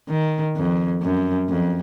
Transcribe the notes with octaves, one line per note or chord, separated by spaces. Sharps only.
D#3
F2
F#2
F2